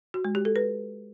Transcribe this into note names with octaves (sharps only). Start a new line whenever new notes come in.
F#4
G#3
G4
A4
B4